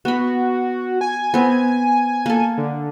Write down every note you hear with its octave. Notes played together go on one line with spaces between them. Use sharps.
B3 F#4 B5
G#5
B3 C4
A#3 A4
D3